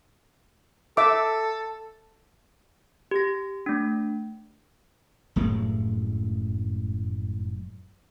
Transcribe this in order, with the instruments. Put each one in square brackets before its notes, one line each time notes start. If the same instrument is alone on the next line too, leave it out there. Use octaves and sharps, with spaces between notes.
[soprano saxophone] A4 [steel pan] E5 D6
[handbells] G4 A#6
A3 D4
[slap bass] F1 F#2 A2 G#3